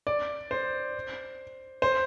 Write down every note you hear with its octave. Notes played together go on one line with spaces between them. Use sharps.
D5
C5
C5